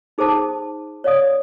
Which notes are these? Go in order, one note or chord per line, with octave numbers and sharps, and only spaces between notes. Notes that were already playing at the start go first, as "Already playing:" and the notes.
D#4 G#4 A4 C5 A5 D6
C#5 D5 F5 D#6